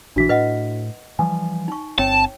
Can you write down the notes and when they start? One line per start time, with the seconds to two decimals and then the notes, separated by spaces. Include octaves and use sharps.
0.16 A#1 D#3 E3 D4 F#4 B6
0.29 A2 B4 D#5 F#5
1.19 E3 F3 G3 G#5
1.68 D#4 C#6
1.98 G1 C4 C#5 G5 A5